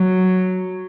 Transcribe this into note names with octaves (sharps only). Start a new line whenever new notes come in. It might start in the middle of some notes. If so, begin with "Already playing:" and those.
Already playing: F#3